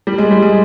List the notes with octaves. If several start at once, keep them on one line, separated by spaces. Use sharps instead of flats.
G3
G#3
G3
G#3